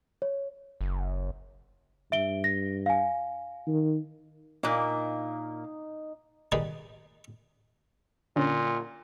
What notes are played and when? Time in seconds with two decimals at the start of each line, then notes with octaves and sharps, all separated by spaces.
0.22 C#5
0.81 F#1
2.12 G2 E5 D7 G7
2.44 A#6
2.86 F5 G#5
3.68 D#3
4.63 A#2 A#3 D#4
6.52 D#3 G3 G#3 D#4 G#4 B4
8.36 A#2 D3 C#4